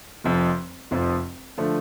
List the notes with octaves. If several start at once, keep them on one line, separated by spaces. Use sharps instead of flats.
F1 F2 F3
F1 F2 F3
D3 F3 A3